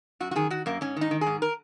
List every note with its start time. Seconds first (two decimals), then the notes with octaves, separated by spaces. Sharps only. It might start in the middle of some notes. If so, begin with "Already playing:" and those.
0.20 F#2 F#4
0.31 F#4
0.36 D#3 G#4
0.50 D#3 F#4
0.66 F#2 A#3
0.81 G#2 C#4
0.97 D#3 D#4
1.11 D#3
1.21 G#4
1.27 G#2
1.42 A#4